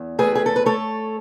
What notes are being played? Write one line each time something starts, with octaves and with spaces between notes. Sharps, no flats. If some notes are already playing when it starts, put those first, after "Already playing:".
Already playing: E2
A3 G#4 B4
G#4
A4
B4
A3 A4 C#5